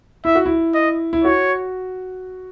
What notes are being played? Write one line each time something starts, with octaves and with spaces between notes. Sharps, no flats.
E4 E5
F#4
E4
D#5
E4
F#4 C#5